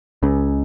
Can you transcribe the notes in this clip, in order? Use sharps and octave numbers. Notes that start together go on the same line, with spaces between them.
C#2 C#3